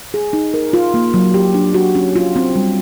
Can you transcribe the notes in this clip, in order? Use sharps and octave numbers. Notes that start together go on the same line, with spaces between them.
G#4
D#4
A#4
F4
A#3
F#3
G4
D4
F#4
C#4
F4
C4
G3